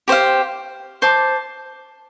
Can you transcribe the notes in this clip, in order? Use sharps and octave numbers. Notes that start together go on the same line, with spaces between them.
G4 C5 F5
C5 A5 D6